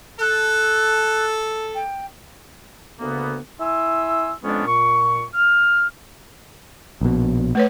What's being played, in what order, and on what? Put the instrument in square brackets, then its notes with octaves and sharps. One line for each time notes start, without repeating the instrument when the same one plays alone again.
[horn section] A4 [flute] F#6
[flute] G5
[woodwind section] D2 C#3 A#3 B3
E4 G#5 C6 E6
F2 G#3 B3 C#4 D4
A#2 C#6
F6
[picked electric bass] A#1 B2
[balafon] A3 B4 C#5